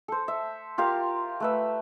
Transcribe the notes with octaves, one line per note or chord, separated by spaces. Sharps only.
A4 C5
E5
F4 G4 A#4 F5
A3 B4 E5